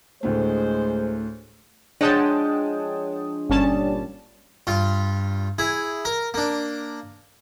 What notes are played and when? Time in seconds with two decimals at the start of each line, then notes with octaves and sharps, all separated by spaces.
0.23 D2 A2 G#3 A3 C5
2.01 F3 G#3 D4 C#5 F#5 G5 A5 D#6
3.49 G1 A#2 G3 C#4 A5
4.67 G2 F4
5.59 E4 G#4
6.05 A#4
6.34 A#3 D4